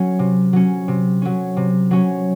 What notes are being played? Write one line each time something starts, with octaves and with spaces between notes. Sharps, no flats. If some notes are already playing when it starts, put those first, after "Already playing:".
Already playing: F#3 C#4
C3
F#3 C#4
C3
F#3 C#4
C3
F#3 C#4